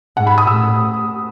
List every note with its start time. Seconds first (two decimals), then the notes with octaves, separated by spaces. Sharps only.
0.17 G#2 F#5
0.27 B5
0.38 D#6
0.47 A2 E6